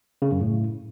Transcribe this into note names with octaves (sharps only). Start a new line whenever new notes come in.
C#3
F#2
A2